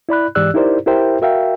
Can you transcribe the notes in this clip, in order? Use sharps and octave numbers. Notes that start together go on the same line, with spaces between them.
E4 D5 B5 F#6
G#2 E3 G4 D5 E6 F#6
D#4 E4 G4 A#4 C5 D5
E4 G4 A#4 C5 E5 G5
F#4 A#4 E5 F5 G5